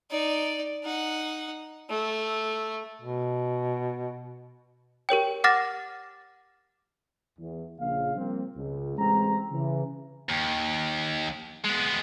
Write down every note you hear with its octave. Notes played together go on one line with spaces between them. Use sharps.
D#4 D5
D#4 F#5
A3
B2
G4 A#4 C#5 G5
F#5 D6 F6 A6 A#6 E7
E2
A#1 C#3 F5
F3 G3 A#3 C4
C#2
A1 G#3 C4 A#5
C#3 E3
D#2
G#3 B3